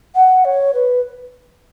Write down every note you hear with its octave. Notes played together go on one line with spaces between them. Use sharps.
F#5
C#5
B4